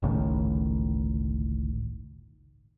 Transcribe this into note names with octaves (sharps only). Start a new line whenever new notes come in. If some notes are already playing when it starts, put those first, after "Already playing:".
G1 C#2 A2 D#3